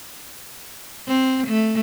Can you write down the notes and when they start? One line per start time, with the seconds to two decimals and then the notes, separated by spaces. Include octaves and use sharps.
1.08 C4
1.47 A3